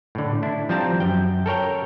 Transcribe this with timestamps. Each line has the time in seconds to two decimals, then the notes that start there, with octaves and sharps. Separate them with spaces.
0.15 A2 D3
0.43 D4 E4
0.69 F3 G3 C4 A5 A#5
1.00 F#2 G5
1.46 A4 A#4 C#5 G5